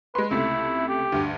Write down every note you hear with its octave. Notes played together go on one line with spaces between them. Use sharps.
G#3 B4 C6
C#2 C3 A3 E4
G4
D2 G2